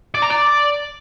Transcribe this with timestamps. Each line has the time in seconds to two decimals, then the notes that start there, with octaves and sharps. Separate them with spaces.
0.14 D5
0.22 A#5
0.30 D5